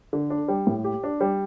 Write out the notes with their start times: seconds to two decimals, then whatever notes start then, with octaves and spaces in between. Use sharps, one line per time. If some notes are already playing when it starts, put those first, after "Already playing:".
0.13 D3
0.30 D4
0.48 G3
0.67 A2
0.84 G4
1.04 D4
1.20 G3